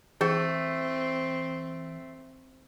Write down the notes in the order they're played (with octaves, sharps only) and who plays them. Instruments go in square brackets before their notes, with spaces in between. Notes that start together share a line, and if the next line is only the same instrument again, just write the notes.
[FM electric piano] E3 [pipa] A3 C5 [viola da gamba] C4 [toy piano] G#4 G5